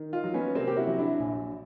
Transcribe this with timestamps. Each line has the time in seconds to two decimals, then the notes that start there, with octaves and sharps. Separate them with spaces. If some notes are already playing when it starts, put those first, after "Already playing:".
Already playing: D#3
0.13 D#4 F4
0.24 F#3
0.34 B3 C#4
0.55 C3 A#3 C4
0.67 G4
0.77 E4 F#4
0.87 F#3
0.99 D4 E4
1.19 A#1